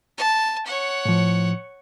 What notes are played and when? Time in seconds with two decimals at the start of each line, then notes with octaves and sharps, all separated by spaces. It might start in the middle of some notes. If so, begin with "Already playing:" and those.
0.17 A5
0.66 C#5 F#5
1.05 A2 F3